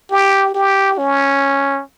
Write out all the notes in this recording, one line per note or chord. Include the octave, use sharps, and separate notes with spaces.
G4
G4
C#4